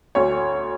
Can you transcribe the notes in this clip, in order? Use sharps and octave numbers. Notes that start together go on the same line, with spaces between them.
D2 C#5